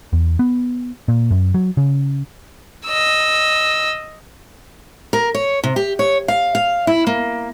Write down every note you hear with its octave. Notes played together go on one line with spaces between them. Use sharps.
E2
B3
A#2
F#2
F#3
C#3
D#5 E6
A#4
C#5
C3
G4
C#5
F5
F5
E4
A#3